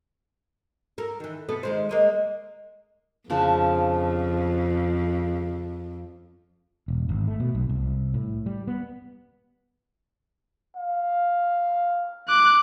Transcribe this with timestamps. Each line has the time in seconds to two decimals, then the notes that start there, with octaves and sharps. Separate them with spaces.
0.98 A4 A#4
1.20 D#3 E3
1.49 C3 B3 A4
1.63 D#3 G#3 C5
1.89 G#3 A#3 D#5
3.30 F2 C#3 F3 D4
6.88 E1
7.09 G#1
7.28 A3
7.40 B2
7.55 B1
7.69 C2
8.14 A2
8.46 G3
8.67 B3
10.76 F5
12.28 D6 F#6